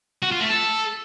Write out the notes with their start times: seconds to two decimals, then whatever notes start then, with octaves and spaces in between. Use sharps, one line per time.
0.22 F#4
0.31 F4
0.41 A3
0.50 A4